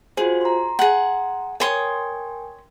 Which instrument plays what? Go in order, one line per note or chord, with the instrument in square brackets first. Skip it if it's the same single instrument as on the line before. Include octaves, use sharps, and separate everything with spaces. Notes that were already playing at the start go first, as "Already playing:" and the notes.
[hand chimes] F4 F#4 C5 [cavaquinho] G#4
[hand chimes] A#5 C6
[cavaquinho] G#4 F#5
[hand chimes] A#4 G5 G#5 [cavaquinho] C#5 C6 D#6